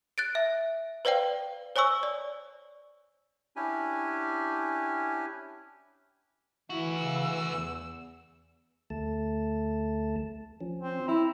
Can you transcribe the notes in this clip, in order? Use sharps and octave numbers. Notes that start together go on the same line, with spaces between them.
F#6 A6 D7
E5
B4 C5 D5 F5 G5
C5 C#5 G#5 C#6 E6
D5
C#4 D4 E4 G4 G#5
E3 A3 E4 F#4
C#3 E6
E2
D2 A3 A5
F3 C#4
C4
E4 E5 A#5